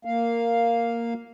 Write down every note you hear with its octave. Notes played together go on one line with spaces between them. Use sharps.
A#3 F5